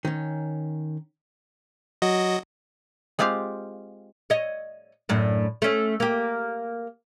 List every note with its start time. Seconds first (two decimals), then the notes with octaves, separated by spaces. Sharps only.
0.05 D#3 C#4
2.02 F#3 F#4 D#5
3.19 G#3 C4 F4 G4 F5
4.30 C#5 D#5
5.09 F#2 A2 D4
5.62 A3 C#4
6.00 A#3 G4